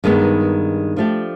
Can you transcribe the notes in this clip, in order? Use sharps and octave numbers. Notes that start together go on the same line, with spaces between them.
G2 D#3 G#3 B3 D#4
F3 A3 D4 G4